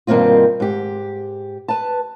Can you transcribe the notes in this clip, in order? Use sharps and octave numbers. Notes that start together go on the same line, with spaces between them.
G2 B2 D#3 A#3 C4 F4
G#2 G4
B4 A5